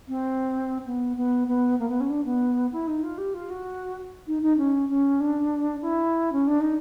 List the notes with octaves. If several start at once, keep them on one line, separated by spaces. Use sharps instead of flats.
C4
B3
B3
B3
A#3
B3
C#4
D4
B3
E4
D#4
F4
G4
F4
F#4
D#4
D#4
C#4
C#4
D4
E4
C#4
D4
D#4